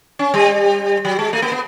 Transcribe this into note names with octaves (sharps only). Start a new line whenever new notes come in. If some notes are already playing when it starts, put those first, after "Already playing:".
C#4
G3
F#3
G#3
A3
A#3
B3